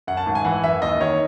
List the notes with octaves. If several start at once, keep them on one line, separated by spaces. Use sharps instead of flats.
F#2 F#5
A5
G#1
G#5
E3 F#5
F#2 E5
D#2 D#5
D#3 C#5